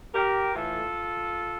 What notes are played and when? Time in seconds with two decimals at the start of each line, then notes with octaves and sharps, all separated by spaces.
0.15 G4 A#4
0.55 A2 E3 F4 A4